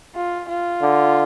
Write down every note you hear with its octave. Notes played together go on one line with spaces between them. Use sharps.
F4
F4
D3